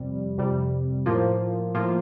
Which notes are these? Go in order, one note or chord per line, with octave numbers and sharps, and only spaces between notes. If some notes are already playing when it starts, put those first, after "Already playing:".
Already playing: F2 C3 G3
F2 C3 G3
A2 F3 A#3 F4
A2 F3 A#3 F4